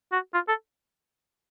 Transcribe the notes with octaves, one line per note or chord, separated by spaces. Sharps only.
F#4
F4
A4